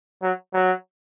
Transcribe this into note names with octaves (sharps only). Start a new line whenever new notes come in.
F#3
F#3